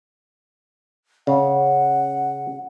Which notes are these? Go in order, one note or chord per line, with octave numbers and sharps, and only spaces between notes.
C#3 F#5